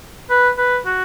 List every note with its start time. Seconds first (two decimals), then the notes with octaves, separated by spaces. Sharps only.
0.30 B4
0.58 B4
0.85 F#4